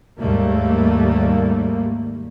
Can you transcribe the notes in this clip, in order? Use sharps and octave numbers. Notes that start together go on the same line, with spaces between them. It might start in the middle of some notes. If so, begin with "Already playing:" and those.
D#2 G#2 G3 A3 A#3